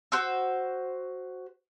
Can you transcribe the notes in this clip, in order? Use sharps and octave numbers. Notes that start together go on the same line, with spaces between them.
F#4 C5 E6